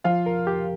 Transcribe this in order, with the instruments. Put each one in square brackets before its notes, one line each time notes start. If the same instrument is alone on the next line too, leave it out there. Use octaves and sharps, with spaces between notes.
[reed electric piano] F3 [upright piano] F4 F5
[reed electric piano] A#4
G4